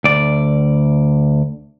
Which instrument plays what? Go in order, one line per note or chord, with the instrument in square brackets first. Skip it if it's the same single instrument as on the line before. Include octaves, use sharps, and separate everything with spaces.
[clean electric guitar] D2 D5